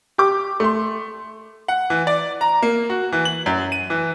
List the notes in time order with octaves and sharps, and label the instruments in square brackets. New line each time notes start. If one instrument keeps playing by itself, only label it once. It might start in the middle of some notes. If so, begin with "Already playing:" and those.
[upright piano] G4 D6
A3 C6
[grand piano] F#5
E3
D5
A#5
A#3
F#4
E3
F#7
F#2
D#7
E3